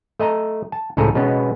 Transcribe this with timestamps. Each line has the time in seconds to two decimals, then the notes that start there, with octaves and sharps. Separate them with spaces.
0.20 A3 D#5 A5 A#5
0.72 A5
0.97 C#2 A2 F3 G#4 A4 A#5
1.15 B2 G#3 B3 C#4